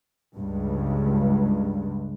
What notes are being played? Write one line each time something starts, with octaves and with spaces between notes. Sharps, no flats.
C#2 G2